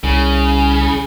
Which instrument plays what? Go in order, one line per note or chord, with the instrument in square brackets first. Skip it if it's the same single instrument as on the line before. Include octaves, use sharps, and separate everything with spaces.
[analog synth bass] C2 [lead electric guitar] C#3